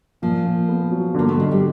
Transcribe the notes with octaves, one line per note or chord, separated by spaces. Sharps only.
A#2 F3
A#2
B3
F#3
D3 A#3
A3
D3 G#3
G3